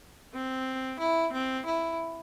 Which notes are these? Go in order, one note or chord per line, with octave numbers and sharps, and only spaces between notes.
C4
E4
C4
E4